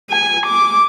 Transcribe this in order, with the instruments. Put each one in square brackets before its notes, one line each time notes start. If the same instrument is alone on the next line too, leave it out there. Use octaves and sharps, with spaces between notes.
[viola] G#5
D6